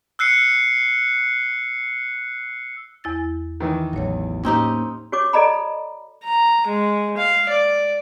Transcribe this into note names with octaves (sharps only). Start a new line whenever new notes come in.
E6 F#6 C7 C#7
E2 E4 A6
D#3 E3
A1 E2 F#3 C#5
A2 A#3 C4 C#4 D#4 G4
F#4 C#5 C#6 D6
A4 D5 D#5 A#5 B5
A#5
G#3
F5
D5